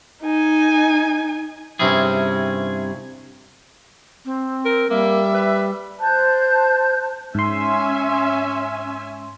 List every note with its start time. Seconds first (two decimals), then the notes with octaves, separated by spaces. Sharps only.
0.23 D#4 G#5
1.79 G2 C3 C4 C#4 E4 G#4
4.25 C4
4.65 A#4
4.90 G3 A#3 E5
5.34 B4
6.00 C5 A5 F#6 G6
7.35 G#2 C#4 E5 G#5 C6